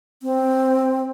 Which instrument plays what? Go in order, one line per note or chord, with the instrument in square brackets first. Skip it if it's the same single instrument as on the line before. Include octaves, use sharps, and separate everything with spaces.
[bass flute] C4